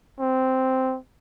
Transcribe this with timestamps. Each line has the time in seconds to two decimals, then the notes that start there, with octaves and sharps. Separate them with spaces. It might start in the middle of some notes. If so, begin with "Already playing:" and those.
0.20 C4